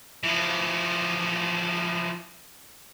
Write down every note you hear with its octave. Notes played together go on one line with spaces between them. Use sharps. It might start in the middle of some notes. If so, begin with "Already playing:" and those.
E3 F3